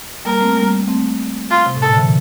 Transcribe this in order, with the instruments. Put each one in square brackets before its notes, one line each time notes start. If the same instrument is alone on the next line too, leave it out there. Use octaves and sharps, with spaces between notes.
[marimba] G3 A#3 [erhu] A#4
[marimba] A3 C4
G3 A#3
A3 C4
[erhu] F4
[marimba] C3
A2
[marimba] A#2 [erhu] A4
[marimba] D3
C3 E3